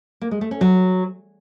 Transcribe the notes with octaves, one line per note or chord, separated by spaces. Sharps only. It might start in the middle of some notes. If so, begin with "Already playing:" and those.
A#3
G#3
A3
C#4
F#3